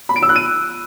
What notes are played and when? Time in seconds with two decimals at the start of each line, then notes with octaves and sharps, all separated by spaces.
0.09 B5
0.16 D7
0.22 E6
0.29 F#6
0.36 D#7